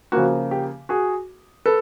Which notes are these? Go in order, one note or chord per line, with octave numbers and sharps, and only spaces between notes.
C#3 F3 A#3 F#4
G4
F#4 G#4
A4 B4